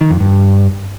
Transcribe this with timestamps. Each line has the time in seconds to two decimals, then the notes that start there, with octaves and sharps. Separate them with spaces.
0.01 D#3
0.10 F2
0.20 G2